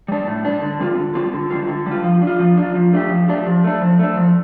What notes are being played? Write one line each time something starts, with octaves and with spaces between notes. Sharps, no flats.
G3 D4
A2
G3 D4
D3
G3 C4 F4
D3
G3 C4 F4
D3
G3 F4
D3
G3 F4
F3
D4
F4
F3
D4 F4
F3
A3 D4 G4
F3
A3 D4 G4
F3
A3 D4
F3
A3 D4
F3